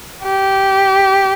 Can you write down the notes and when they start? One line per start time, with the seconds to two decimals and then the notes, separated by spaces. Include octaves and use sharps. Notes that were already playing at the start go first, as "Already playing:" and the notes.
0.24 G4